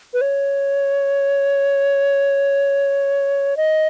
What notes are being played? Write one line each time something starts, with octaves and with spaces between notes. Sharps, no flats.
B4
C#5
D#5